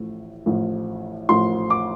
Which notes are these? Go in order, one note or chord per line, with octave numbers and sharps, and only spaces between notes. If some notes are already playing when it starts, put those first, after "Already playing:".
Already playing: A1 A2 F3
A1 A2 F3
A1 A2 F3 C6
D6